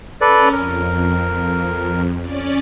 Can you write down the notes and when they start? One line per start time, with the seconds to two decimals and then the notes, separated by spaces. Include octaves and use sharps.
0.21 C#4 A4 B4 D5
0.52 F2 A#4
2.21 C#4 D5